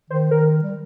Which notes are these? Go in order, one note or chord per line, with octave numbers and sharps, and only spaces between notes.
D#3 C5
D#3 A#4
G3